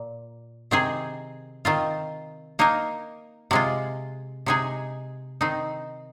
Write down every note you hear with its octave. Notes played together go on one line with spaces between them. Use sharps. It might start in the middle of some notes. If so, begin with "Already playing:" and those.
Already playing: A#2
C3 D#3 C4 G#4 C5
D#3 C4 F4
A#3 D#4 A#4
C3 G#3 F4
C3 G#3 D#4 G#4
D#3 C4 D#4